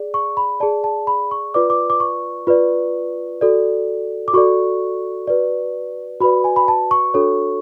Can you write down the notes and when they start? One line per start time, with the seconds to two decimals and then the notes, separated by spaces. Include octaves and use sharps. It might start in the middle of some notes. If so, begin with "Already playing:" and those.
Already playing: G#4 D5
0.14 C#6
0.37 B5
0.60 G#4 D5 A5
0.84 A5
1.07 B5
1.31 C#6
1.54 F4 B4 D5 D6
1.70 D6
1.90 D6
2.00 C#6
2.47 F4 B4 D5
3.41 F#4 A4 D5
4.28 D6
4.34 F#4 A4 D5 C#6
5.27 F#4 B4 D5
6.20 F#4 B4 D5 B5
6.44 G#5
6.56 B5
6.68 A5
6.91 C#6
7.14 D4 F#4 A4 C#5